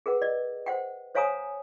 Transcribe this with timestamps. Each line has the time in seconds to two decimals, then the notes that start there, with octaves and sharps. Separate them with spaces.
0.06 G#4 A#4 B4 F#5
0.22 D5 D#5
0.66 C5 F#5 G5
1.15 C5 C#5 F5 G#5 A#5 D#6